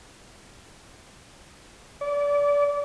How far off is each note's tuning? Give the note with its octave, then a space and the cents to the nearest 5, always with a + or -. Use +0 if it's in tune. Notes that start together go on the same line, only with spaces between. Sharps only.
D5 -30